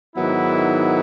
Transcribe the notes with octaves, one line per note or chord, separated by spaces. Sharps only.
G#2 D#3 F#3 B3 E4